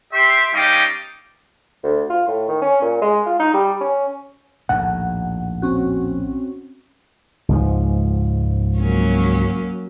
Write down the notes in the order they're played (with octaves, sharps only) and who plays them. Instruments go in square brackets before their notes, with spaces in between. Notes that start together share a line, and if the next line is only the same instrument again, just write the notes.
[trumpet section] G4 E5 C6
G3 C#4 D#4 F5 G5 D6
[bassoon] D2
F4
A2
D#3
C#4
A#2
G#3
F4
D#4
G3
C#4
[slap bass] A#1 D#2 A2 [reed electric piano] F#5
[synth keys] C4 C#4 F#4
[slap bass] C#2 G#2 F3
[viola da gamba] F#3 A#3 C#4